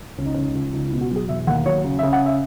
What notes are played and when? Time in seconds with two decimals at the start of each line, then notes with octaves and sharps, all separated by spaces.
0.18 C#2 C#4
0.26 D#4
0.34 C#2 C#4
0.42 D#4
0.51 C#4
0.55 C#2
0.73 C#2 D#4
0.88 E4
0.93 B2
1.01 F#4
1.11 F#3 G#4
1.29 E1 E5
1.47 D#2 F#5
1.66 F#3 C#5
1.84 C#3
1.99 E5
2.03 C#3
2.13 F#5
2.26 E5